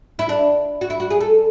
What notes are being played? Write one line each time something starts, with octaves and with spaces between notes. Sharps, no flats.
E4
D4
F#4
E4
F#4
G#4
A4